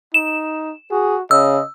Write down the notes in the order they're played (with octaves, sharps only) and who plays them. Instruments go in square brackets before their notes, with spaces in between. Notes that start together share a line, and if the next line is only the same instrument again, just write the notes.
[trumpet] D#4 [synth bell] E7
[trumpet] F#4 [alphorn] G#4
[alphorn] C#3 [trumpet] D#5 [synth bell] E6